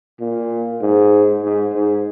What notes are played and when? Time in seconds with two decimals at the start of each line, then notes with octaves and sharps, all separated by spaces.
0.20 A#2
0.81 G#2
1.43 G#2
1.74 G#2